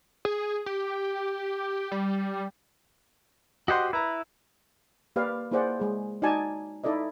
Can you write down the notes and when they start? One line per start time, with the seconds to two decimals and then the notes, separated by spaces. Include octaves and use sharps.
0.25 G#4
0.66 G4
1.92 G3
3.68 F#4 G4 C5 D#5 F#5 C6
3.93 E4 B4 A#5
5.16 A#3 G4 B4 D5 F5
5.51 A#3 E4 G#4 C5 D5 F#5
5.80 G#3 G#4
6.22 D#4 F#4 D5 G#5 A5
6.84 D#4 E4 A4 D5 D#5